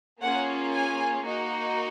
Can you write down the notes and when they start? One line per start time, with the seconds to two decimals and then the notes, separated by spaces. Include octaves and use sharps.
0.22 A#3 C#4 F4 G#4 F#5
0.72 G#5
1.24 A#3 D#4 F#4